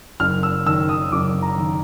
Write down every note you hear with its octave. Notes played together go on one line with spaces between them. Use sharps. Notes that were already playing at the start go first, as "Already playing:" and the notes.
F#1 F6
E6
D#3 E6
D#6
F#1 D6
A#5
D#3